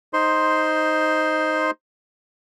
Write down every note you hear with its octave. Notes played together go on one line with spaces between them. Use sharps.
D#4 C5 C6